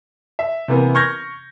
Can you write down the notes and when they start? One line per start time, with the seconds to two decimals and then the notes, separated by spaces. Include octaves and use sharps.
0.39 E5
0.68 C3 E3 A#3 B3
0.95 C#6 F6 G6 G#6 A#6